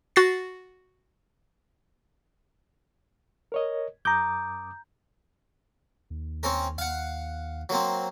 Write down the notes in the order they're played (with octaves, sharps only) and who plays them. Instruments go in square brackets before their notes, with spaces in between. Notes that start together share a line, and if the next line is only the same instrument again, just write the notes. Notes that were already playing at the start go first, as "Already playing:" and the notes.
[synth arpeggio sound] F#4 A6 C7
[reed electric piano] A#4 C#5 D#5
[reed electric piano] F#2 D6 D#6 [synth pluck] A#5 G6
[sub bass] D#2
[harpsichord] C4 C#4 A#4
[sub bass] D#2 [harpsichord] F5 F#5
[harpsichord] F#3 A#3 C4